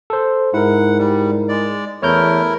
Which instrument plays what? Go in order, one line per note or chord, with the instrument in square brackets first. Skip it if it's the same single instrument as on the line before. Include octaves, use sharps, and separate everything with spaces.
[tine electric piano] A4 C5
[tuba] G#2 [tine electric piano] E4 A#4 [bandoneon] F#5
[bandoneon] G3
G#3 D5
[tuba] E2 [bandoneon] A3 E4 A#4 [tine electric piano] C#5 F6 G6